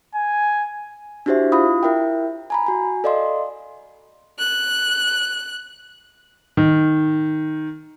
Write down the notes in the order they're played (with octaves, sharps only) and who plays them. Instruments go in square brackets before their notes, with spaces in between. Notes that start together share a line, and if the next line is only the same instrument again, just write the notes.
[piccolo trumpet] G#5
[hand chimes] D4 E4 F#4 G4 C5 E5
E4 F4 F5 B5 D#6
E4 A#4 E5 G5
G#5 A#5 B5
F#4 G#5
A4 D5 D#5 F5 C6
[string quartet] F#6
[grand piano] D#3